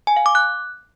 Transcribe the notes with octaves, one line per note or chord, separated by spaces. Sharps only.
G#5
F5
D6
F#6